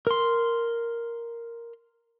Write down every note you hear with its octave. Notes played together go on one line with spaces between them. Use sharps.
A#4 C6